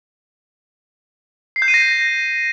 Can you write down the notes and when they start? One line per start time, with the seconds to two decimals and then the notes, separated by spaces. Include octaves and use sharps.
1.56 C7
1.62 G6
1.68 D#7
1.74 A#6